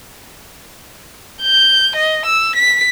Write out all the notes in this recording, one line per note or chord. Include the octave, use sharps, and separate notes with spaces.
G6
D#5
E6
B6